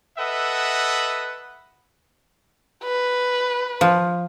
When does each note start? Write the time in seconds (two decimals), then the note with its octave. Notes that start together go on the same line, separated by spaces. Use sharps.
0.18 A4 B4 D#5 E5 F#5
2.84 B4
3.81 F3